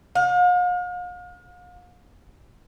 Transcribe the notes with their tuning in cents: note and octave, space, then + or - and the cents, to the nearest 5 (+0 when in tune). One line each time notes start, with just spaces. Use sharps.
F5 +40